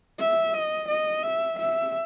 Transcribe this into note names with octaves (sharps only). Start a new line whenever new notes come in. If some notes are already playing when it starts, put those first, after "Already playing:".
E5
D#5
D#5
E5
E5